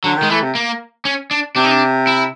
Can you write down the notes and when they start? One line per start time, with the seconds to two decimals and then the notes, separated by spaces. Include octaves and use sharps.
0.04 D3 F#3
0.17 D#3
0.23 G#3
0.30 E3 A3
0.43 C3
0.55 A#3
1.05 C#4
1.31 D4
1.56 C3 D4
1.64 D#4
1.71 D4
2.07 E4